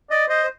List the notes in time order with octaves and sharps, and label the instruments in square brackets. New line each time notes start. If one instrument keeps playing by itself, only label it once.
[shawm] D5 [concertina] D#5
[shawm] C5 [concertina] D#5
[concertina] C5